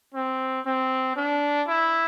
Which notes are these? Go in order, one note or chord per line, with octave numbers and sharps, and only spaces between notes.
C4
C4
D4
E4